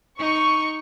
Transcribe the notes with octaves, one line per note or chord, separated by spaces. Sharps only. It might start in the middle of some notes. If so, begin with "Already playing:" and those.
D#4 C#6